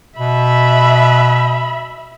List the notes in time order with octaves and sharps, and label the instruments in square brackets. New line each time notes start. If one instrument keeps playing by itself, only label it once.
[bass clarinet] B2 [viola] E5 B5